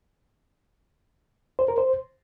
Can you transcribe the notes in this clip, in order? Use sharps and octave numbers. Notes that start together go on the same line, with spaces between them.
C5
A#4
C5